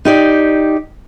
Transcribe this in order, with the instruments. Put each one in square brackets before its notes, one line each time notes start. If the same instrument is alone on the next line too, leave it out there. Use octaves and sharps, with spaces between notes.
[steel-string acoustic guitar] D#4 G4 D5